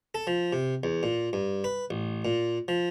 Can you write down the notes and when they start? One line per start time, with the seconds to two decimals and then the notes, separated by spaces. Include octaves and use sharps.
0.15 A4
0.27 F3
0.53 C3
0.84 E2
1.03 A#2
1.33 G2
1.64 B4
1.90 A1
2.25 A#2
2.68 F3